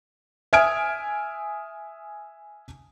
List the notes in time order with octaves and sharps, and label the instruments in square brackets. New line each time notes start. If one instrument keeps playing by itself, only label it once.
[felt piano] E5 G#5 D#6 F6 G#6 D7